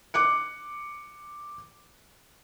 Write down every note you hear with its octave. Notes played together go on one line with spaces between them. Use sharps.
D6 F#6 C#7